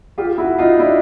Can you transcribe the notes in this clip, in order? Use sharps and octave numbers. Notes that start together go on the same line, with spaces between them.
F4 G4
E4 F#4
D#4 F4
D4 E4